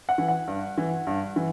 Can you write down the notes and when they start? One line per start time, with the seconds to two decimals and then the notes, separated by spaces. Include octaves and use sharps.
0.09 F#5
0.18 E3
0.28 F#5
0.48 G2
0.78 E3
1.07 G2
1.36 E3